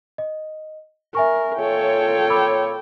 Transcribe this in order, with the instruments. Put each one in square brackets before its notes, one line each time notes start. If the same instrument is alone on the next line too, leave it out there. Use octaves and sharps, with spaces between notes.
[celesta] D#5
[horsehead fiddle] A#4 [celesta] E5 G#5 C#6
[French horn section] A#2 F4 C#5 [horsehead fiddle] A4 G5
[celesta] B5 D6 E6